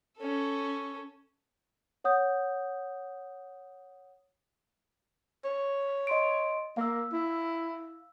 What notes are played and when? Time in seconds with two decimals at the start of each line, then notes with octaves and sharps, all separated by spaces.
0.18 C#4 A4
2.04 C#5 F#5 D#6 G6
5.44 C#5
6.07 D#5 C6 D7
6.77 A#3 F5 E6
7.13 E4